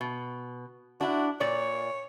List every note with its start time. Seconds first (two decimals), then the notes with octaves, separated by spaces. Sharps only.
0.01 B2
1.01 D4 E4 F#4
1.40 A#2 C#5 D5